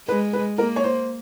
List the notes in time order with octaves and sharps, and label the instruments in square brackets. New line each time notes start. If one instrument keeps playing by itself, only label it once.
[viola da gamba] G#3 [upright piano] B4
[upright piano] B4
[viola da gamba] A#3 [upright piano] A#4
[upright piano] C#5
C5